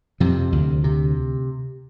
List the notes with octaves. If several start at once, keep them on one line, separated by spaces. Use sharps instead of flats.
F2 C3 F3
D2
C3